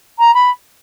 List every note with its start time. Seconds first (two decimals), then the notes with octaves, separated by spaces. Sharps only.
0.19 A#5
0.34 B5